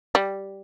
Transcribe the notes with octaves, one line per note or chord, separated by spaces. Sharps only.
G3